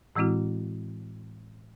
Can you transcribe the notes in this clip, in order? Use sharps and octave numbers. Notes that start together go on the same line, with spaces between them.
A2 E3 G#3 C4 E4 F#4